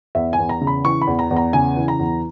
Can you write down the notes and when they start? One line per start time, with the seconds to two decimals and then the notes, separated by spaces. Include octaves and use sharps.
0.15 E2 E5
0.33 G#5
0.39 E2
0.49 A#5
0.61 C#3
0.67 B5
0.85 E3 C#6
1.02 B5
1.07 E2
1.19 A#5
1.31 E2
1.36 A#5
1.53 C#3 G#5
1.77 E3
1.88 A#5
1.99 E2